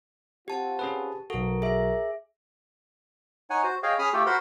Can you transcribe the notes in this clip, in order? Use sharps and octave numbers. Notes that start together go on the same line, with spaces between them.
C4 F4 G4 F#5 A5
C#4 G#4 B4
B1 F#4 A4 A#4
G#4 E5
D#4 C#5 F#5 G#5
F#4 C5
G#4 C#5 D#5 F5 G5
C#4 G#4 B5 D#6 F6
A3 F4 G4 A4 G5
F#4 A#4 C5 F#5 B5 C6